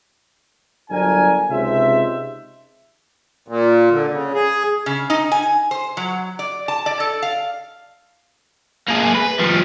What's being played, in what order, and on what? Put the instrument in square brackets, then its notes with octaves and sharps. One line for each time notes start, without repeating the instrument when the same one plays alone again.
[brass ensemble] G1 F#3 D4 A#4 G#5
C#2 C3 D#4 C5 E5
[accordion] A#2
D3
C#3
G#4
[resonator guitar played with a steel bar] C#3
D#4
G#5
C5
F#3
D5
A5
D5
A4
F5
[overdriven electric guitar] A#3 G#4
B4
F3 G3